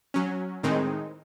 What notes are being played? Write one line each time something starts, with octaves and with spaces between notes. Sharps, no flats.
F#3 C#4
A2 D#3 G#3 C4 D#4